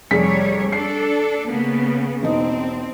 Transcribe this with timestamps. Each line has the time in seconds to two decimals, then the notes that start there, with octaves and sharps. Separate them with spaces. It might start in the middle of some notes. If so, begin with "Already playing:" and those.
0.11 F1 G3 G#4 C#5 B6
0.72 D4 A4 C7
1.50 C#3 A#3 B3
2.23 E1 C4 D#4